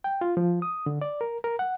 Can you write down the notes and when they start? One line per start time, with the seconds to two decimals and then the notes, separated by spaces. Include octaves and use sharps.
0.04 G5
0.21 F4
0.37 F3
0.62 D#6
0.86 D3
1.02 D5
1.21 A#4
1.44 A#4
1.59 F#5